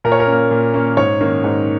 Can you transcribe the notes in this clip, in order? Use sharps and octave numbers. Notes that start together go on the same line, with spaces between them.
A#2 A#4
C#5
A#4
C#4
A#3
A#2
A#3 C#4
G#2 C#5
D#3 A#3 C#4
G#2